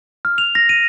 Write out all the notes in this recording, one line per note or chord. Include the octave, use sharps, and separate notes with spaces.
F6
F7
A#6
D#7